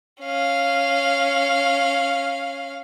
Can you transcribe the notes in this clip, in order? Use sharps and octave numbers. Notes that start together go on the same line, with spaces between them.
C#4 F5